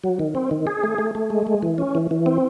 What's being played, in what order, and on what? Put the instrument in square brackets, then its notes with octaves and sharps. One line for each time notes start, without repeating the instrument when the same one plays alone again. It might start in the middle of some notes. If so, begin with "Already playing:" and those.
[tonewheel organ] F#3
D#3
C4
D#3
G#4
A3
A3
A3
G#3
G#3
E3
C#4
E3
E3
C4